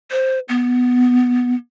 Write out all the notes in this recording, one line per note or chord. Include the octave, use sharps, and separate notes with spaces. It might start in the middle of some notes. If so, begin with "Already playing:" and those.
C5
B3